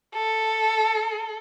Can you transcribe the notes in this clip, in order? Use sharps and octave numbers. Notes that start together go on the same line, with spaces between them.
A4